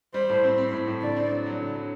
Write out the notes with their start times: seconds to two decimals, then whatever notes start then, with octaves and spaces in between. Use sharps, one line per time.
0.14 G3 C5
0.29 A2
0.44 C4
0.58 C4
0.73 A2
0.87 A2
1.02 D3 D5
1.16 C4
1.32 F#3
1.46 F#3
1.61 D3
1.75 F#3